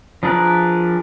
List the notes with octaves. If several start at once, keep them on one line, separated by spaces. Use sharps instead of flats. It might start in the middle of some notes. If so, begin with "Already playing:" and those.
F3 D4 G#4 A#4 B4